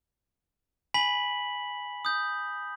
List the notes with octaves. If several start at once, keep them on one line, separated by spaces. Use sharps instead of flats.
G#5 B5 B6 F#7
D#6 G6